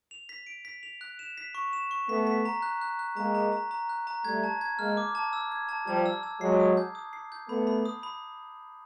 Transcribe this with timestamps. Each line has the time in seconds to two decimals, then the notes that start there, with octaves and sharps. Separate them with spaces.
0.11 F7
0.29 B6
0.47 D7
0.65 B6
0.83 F7
1.01 F#6
1.19 E7
1.38 B6
1.55 C#6
1.73 E7
1.91 C#6
2.09 A3 B3 B6
2.27 B6
2.45 A#5
2.62 F#6
2.81 F#6
2.99 F#6
3.17 G#3 A#3 A#5
3.35 A#5
3.52 A#5
3.71 A#5
3.89 F#6
4.07 A#5
4.25 G3 A3 G#6
4.44 A5
4.61 G#6
4.79 G#3 A#3 F6
4.97 D6
5.15 A5
5.33 E6
5.52 G#6
5.69 A5
5.87 F3 G3 A5
6.06 E6
6.23 E6
6.41 F#3 G#3 C7
6.60 D#6
6.77 G6
6.95 D#6
7.13 C7
7.32 G6
7.49 A3 B3 B5
7.67 B5
7.85 D#6
8.03 B5